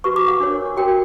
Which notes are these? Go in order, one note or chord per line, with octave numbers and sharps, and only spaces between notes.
F#4 B4 C#6
D6
F#5
D4 A#4 C#5
F#4 A#4 C#5 G5